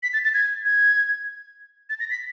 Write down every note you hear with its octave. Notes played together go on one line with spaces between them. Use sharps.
B6
A6
A6
G#6
G#6
A6
A#6
B6